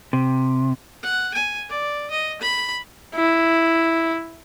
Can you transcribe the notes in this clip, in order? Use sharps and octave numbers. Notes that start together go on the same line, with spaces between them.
C3
F#5
G#5
D5
D#5
B5
E4